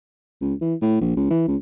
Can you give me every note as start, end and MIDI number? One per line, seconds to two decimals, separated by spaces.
0.41 0.54 37
0.61 0.74 52
0.82 0.96 45
1.01 1.14 34
1.17 1.26 37
1.30 1.44 52
1.48 1.56 37